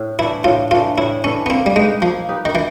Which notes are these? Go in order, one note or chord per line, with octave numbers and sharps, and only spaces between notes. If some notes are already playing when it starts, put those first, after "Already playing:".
Already playing: A2
E3 A3 D4 E4
A2 F4
E3 A3 D4 F4
A2 E4
E3 A3 C#4 D4
B3
A#3 C4
G3
G#3 D#4 G4 B4
F3 A#3
D#4 G4 B4
D#3
E3